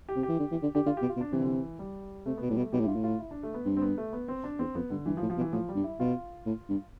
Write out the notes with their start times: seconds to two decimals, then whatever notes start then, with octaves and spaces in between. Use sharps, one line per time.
0.09 G4
0.16 C3
0.23 G4
0.29 E3
0.39 D3
0.51 E3
0.63 D3
0.75 D3 G4
0.86 D3 F4
0.97 B2 G4
1.09 F4
1.17 B2
1.21 D4
1.32 C3 E3
1.40 D3
1.47 E3
1.79 G3
2.26 C3 A3
2.37 B2 B3
2.49 A2 G3
2.58 B2
2.61 A3
2.72 B2 G4
2.80 A2
2.84 E4
2.87 G2 F4
2.95 A2
3.04 F4
3.19 E4
3.31 D4
3.43 A3
3.54 B3
3.66 G2 C4
3.77 C4
3.82 B3
3.98 A3
4.13 B3
4.28 C4
4.44 D4
4.59 E2 C4
4.75 F2 B3
4.90 G2 D3
5.06 G2 E3
5.17 F3
5.22 A2
5.30 F3
5.37 B2
5.41 E3
5.53 A2 F3
5.69 G3
5.76 G2
5.84 E4
6.00 B2 F4
6.46 A2
6.69 G2